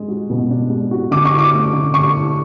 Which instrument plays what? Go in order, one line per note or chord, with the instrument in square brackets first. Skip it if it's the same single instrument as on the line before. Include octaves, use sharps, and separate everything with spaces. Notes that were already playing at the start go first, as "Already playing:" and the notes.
Already playing: [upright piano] G#3 D4
F#4
B2
D4
G#3
F#4
[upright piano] D3 [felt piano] D6
[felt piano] C#6
[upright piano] E4
[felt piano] D6
[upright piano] A3
D3
[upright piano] D3 [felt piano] C#6
[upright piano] E4